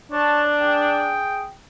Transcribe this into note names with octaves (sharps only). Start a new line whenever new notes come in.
D4 C#5 A5
G#4 G5